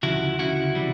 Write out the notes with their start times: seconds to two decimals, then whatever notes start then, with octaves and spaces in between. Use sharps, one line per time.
0.03 D2 C#3 F3 E4 F#4
0.39 D2 C#3 F3 E4 F#4
0.75 C3 E3 G3